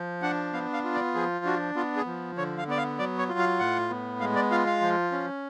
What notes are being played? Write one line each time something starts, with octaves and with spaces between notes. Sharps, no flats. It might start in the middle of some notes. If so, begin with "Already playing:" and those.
Already playing: F3
D4 F#5
B3 F5
F5
F4
D5
F3 G#4
D4 F#4
B3 F4
G#4
F3
D3 C#5
F5
B3 D5
F5
F#3 D5
C#5
F4
F5
A2 F#5
B3
G#3 F5
D5
F4 F5
F5
F3
C#4